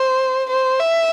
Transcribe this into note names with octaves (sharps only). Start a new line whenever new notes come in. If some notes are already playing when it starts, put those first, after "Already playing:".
Already playing: C5
C5
E5